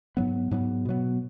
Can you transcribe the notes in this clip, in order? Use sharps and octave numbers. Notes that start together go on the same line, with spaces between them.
G#2 F#3 B3
G#2 F#3 B3
B2 F#3 B3